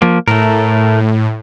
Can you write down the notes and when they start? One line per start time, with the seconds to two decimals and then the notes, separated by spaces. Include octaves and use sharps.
0.02 F3 A#3
0.28 A2 A3 A#4